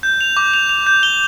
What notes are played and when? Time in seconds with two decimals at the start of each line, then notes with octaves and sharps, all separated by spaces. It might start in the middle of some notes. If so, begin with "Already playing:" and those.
0.03 G6
0.21 F7
0.37 D6
0.54 F7
0.69 F7
0.87 G6
1.03 G7